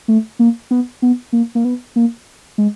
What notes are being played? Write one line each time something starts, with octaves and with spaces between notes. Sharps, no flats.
A3
A#3
B3
B3
A#3
A#3
B3
A#3
G#3